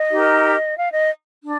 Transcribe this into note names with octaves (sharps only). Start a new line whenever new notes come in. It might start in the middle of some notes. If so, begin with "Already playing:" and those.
Already playing: D#5
D#4 G4 A#4
F5
D#5
D4